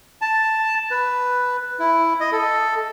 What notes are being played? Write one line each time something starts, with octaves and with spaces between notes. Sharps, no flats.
A5
B4
E4
D#5
A4